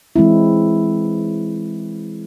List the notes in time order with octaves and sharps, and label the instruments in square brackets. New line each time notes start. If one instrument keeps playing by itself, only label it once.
[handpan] E3 G#3 C4 E4